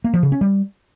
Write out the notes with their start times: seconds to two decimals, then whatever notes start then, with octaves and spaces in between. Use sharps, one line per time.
0.04 A#3
0.14 F3
0.23 C#3
0.32 C#4
0.41 G3